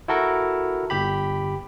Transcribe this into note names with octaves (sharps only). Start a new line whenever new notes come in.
E4 F#4 A4 A#4
G1 G4 B5